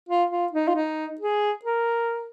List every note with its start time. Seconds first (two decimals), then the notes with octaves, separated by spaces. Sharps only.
0.09 F4
0.31 F4
0.52 D#4
0.68 F4
0.76 D#4
1.21 G#4
1.65 A#4